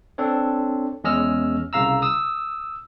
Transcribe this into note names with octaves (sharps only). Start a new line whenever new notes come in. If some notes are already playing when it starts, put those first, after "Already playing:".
C4 D4 A4 C#5
E2 G#3 C#4 D#5 E6 F6
C2 C#3 F5 A#5 E6
D#6 E6